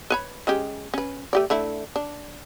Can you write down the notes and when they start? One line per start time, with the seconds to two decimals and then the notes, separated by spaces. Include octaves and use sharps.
0.10 B4 C#5 B5
0.47 G#3 C#4 G4
0.94 C#4 B4
1.33 A3 G4 D5
1.50 D3 A3 E4
1.96 D4